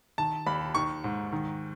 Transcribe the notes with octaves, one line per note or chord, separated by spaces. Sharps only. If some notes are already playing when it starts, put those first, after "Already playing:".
D#3 A5
D#2 B5
D#3 C#6
G#2
D#3